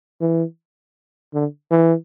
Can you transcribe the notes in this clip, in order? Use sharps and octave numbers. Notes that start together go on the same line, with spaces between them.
E3
D3
E3